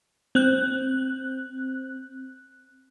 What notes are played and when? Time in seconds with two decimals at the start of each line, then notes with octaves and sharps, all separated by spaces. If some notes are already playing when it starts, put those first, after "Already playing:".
0.35 C4 F#6